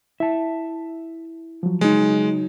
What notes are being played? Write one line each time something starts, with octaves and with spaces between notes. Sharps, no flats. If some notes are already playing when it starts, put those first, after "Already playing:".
E4 E5 A5
F3 F#3
C#3 F#3 G#3 D#4